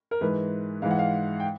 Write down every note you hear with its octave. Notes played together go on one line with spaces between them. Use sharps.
A#4
G#2 E3 B4
G#2 E3 F5
F#5
F5
G5